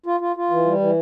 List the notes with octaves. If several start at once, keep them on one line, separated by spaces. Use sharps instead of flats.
F4
F4
F4
E3
G3
E3